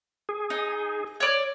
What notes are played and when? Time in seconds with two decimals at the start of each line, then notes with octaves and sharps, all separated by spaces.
0.29 G#4
0.50 D#4
1.20 C#5 D5